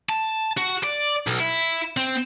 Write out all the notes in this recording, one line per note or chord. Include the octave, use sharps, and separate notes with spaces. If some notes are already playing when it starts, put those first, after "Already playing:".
A5
F#4
D5
B1
E4
C4